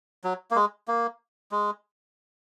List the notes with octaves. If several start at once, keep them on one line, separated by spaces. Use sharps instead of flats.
F#3
A#3
G#3
A#3
G#3